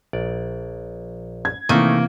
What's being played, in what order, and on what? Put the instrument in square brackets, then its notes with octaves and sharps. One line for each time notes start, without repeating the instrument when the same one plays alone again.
[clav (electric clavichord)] A#1 D5
[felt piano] G#6
[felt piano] C3 E3 [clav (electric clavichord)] D#3 A3 D#4 [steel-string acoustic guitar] A#3